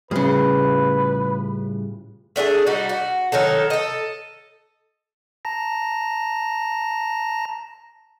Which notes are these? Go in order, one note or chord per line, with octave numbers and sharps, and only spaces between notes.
A2 C#3 G3 F4 G#4 B4
A3 D4 F#4 G#4
G3 D#4 F#4
F#4
D#3 F#3 D#4 A4
A4 D#5
A5 A#5 A#6